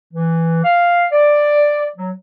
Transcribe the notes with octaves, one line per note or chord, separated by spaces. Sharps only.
E3
F5
D5
F#3